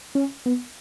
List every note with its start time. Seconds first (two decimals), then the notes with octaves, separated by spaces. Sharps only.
0.15 C#4
0.46 B3